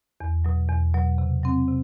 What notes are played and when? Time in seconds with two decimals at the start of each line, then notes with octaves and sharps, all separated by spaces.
0.20 E2
0.45 B2 F#3
0.69 E2
0.94 B2 F#3
1.18 C3
1.43 F#3 C4
1.68 C3